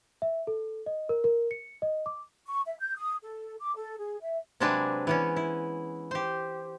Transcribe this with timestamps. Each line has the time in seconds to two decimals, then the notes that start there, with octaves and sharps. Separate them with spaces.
0.22 E5
0.47 A4
0.86 D#5
1.09 A#4
1.24 A#4
1.51 C#7
1.82 D#5
2.06 D6
2.47 C#6
2.66 E5
2.80 G6
2.97 D#6
3.23 A4
3.60 D6
3.76 A4
3.98 G#4
4.22 E5
4.60 C3 F#3 G#3 D4 G#4 B4
5.07 E3 B3 C#4
5.36 E4
6.11 G4 C5